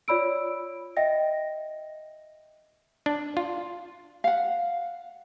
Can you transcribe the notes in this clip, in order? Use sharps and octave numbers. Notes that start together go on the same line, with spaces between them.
F4 C#5 D5 B5 E6 D7
D#5 E5 G5 A#6
D4
F4
F5 F#5